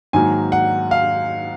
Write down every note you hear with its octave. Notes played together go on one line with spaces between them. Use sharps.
G#2 D#3 F#3 A#3 G#5
F#5
F5